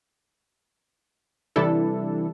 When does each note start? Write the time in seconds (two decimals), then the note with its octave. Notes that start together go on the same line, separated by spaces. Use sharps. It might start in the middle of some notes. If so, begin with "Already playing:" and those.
1.56 C3 E3 G3 D4 E4 A4